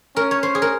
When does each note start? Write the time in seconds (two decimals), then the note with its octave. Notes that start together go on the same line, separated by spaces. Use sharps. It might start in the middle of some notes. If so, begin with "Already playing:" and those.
0.16 C#4 A#4
0.31 C#5
0.43 C5
0.55 G#4
0.62 A#4